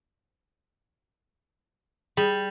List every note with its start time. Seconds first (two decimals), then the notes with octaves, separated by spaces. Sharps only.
2.17 G3 G#4